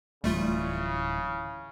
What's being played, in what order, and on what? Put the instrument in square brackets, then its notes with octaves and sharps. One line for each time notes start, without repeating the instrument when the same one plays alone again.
[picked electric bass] D1 E3 [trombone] C#3 [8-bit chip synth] G3 A3 F4